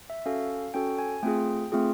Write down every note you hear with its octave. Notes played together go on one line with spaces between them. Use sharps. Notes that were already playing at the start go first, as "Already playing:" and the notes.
E5
C#4 F#4 A4 F5
C#4 F#4 A4 G5
G#5
A3 C4 F4 G#4 G5
A3 C4 F4 G#4